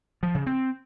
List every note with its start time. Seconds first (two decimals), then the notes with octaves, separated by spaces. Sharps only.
0.23 F3
0.35 C#3
0.46 C4